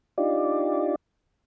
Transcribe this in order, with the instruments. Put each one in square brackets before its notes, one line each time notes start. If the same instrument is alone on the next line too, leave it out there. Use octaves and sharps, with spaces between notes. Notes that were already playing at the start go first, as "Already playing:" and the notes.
[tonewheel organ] D4 D#4 F4 G4 D5